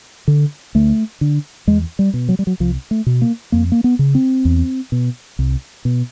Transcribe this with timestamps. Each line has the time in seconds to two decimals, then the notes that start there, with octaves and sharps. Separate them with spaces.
0.28 D3
0.75 D2 A3
1.21 D3
1.67 E2 G#3
1.99 G3
2.14 B2
2.29 F#3
2.39 G3
2.47 F#3
2.60 C2 F3
2.91 A3
3.06 B2
3.22 A#3
3.52 F2 A#3
3.72 A#3
3.84 B3
3.99 C#3
4.15 C4
4.45 E2
4.92 B2
5.39 C2
5.85 B2